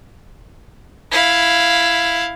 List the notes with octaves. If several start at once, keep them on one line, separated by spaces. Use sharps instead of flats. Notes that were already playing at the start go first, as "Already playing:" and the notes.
E4 F5